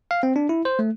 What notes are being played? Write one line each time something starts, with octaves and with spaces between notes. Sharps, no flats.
F5
C4
D4
E4
C5
A3